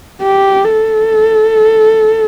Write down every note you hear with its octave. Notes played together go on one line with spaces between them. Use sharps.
G4
A4